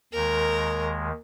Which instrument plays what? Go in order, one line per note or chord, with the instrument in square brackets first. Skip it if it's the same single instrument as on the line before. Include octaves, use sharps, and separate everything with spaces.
[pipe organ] D#2 D#3 G#3 [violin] A#4